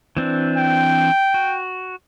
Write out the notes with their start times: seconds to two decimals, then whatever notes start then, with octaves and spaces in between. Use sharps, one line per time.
0.17 E3 C4 D4
0.57 G5
1.34 F#4